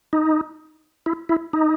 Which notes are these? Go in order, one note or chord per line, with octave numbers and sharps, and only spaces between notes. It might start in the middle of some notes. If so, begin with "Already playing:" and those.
D#4
E4
E4
D#4